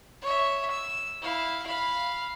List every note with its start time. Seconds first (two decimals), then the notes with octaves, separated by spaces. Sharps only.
0.22 C#5 E5
0.71 E6
1.22 E4 F5
1.66 F5 B5